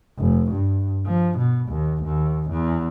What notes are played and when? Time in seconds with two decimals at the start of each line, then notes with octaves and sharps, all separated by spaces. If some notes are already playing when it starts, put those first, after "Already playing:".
0.18 F1
0.52 G2
1.06 F3
1.39 B2
1.69 D#2
2.03 D#2
2.51 E2